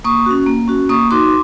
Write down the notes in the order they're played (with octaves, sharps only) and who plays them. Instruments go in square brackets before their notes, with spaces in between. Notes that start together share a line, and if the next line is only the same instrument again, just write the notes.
[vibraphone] A#3 C#6 D#6
C#4 F#4
A#3
C#4 F#4
A#3 C#6 D#6
D#4 F#4 C6 D6